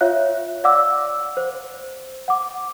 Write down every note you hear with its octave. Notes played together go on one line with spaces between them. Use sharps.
F4 C#5 E5 F5 F#6
D5 F5 F#5 D6 E6
C5
F#5 D6